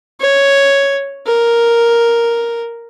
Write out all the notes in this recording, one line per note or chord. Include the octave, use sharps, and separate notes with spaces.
C#5
A#4